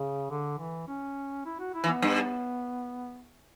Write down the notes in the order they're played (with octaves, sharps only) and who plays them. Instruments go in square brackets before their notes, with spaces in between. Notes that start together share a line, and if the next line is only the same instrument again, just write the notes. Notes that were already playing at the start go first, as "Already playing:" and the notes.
Already playing: [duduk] C#3
D3
E3
C#4
E4
F#4
E4
[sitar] E3
[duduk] B3
[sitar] G2